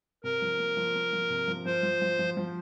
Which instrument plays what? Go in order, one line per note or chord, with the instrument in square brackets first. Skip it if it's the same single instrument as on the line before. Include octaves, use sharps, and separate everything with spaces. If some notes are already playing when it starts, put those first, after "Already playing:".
[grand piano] C3 [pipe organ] A#4
[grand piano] F3
A#3
F3
A#3
F3
C3
F3
[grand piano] F3 [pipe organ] C5
[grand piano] F3
F3
F3
F3